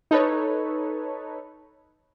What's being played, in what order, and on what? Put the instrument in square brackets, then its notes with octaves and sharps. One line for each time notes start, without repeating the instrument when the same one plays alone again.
[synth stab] D#4 A4 B4 C#5